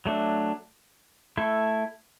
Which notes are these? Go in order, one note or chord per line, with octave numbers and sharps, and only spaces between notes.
F#3 A3 D4
A3 E4 A4